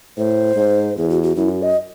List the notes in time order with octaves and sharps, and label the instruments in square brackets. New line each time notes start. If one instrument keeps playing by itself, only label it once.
[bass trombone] A2 [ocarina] C5
[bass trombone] G#2
[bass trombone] E2 [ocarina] G#4
[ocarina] F#4
F#4
[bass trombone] F#2 [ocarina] E4
[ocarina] F#4
D#5